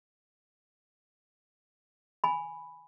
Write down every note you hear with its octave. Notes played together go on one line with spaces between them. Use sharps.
G#5 B5